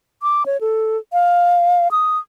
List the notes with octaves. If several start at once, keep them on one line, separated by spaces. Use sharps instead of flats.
D6
C#5
A4
F5
D#6